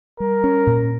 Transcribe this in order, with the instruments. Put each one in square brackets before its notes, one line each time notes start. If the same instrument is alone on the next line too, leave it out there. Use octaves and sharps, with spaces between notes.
[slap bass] G3 [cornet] A#4
[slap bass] C#4
A#2